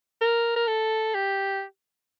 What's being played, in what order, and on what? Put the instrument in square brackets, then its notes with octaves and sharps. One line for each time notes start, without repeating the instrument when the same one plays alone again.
[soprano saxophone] A#4
A#4
A4
G4